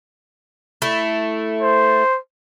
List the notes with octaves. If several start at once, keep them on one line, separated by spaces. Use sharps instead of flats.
A3 E4
C5